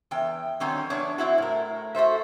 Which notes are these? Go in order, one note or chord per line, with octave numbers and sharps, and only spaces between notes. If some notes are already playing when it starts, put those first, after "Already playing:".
E2 G5
D3 D#3 F#3 C4 C#4 D#4
E2 B3 D4 C#5
C4 E4 F#4
A2 A#4
F#4 A4 C5 E5